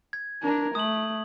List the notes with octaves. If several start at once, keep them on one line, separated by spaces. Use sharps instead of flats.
G#6
D4 A#4
A3 D#6 F#7